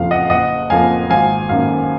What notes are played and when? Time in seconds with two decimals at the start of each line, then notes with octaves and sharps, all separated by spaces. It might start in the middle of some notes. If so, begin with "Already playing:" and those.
Already playing: F#1 F2 F3 F5
0.11 D#5 F#5
0.30 F#1 D#5 F#5
0.70 F2 F3 A#3 F5 G#5
1.10 G#1 F5 G#5
1.49 F#2 D#3 A#3 F5